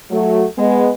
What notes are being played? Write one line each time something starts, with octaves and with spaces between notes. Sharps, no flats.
F#3 A3
G#3 B3